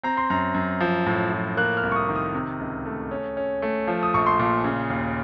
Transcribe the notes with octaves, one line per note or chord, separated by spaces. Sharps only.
C4 A#5
C6
F#2 A#5
F#2
F3
A2
F3
A#3 F#6
F6
C2
C#6
D#6
D#3
D#6
C3
C#2
A3
C#4
C#4
A3
F3
D#6
A#1 C#6
C6
A#2
C#3
D#2